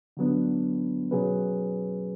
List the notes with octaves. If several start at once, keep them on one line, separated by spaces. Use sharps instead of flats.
D3 F#3 B3 D4
B2 F#3 C#4 G#4 B4